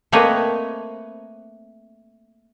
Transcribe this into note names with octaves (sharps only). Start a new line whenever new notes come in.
A3 A#3 C4 B4 C#5 D#5